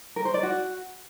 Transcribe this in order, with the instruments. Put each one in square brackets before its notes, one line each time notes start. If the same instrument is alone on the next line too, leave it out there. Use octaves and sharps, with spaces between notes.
[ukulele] A#4
C5
D5
F#4